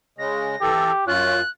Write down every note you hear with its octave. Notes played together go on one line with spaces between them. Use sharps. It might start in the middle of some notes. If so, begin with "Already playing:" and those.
C#3 G#3 A#6
E3 G4 A4
F#2 C#4 F4 F#6